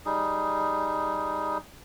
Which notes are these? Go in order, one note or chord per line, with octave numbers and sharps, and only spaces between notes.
G3 D#4 G#4